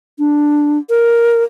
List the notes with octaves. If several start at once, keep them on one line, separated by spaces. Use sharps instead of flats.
D4
A#4